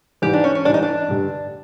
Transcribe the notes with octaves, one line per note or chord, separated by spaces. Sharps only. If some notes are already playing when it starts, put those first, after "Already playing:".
G#2 E3 G3 G4
D4
C#4
C#4
G#2 E3 G3 D4
D#4
D4
G2 D3 G3